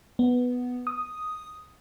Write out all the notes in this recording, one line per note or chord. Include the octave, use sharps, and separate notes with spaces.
B3
D#6